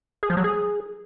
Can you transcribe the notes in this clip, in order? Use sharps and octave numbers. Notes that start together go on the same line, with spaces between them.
G#4
F3
F#3
G#4